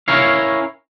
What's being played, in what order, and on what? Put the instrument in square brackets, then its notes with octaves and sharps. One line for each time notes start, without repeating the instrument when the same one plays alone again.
[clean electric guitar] C#4 E4 A#4 C#5 F5